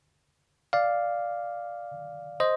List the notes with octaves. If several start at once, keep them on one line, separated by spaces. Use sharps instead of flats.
D5 F5
C5 D#5